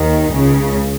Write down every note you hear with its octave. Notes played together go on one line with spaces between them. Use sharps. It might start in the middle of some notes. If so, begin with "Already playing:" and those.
Already playing: D#2 D#3
C#2 C#3